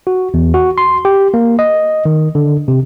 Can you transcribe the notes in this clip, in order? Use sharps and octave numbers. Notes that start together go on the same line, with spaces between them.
F#4
E2
F#4
C6
G4
A#3
D#5
D#3
D3
C3